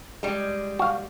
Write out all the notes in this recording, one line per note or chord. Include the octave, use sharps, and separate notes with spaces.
G3 G#3
F#4 F5